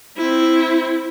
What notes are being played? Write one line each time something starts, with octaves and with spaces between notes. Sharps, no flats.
C4 E4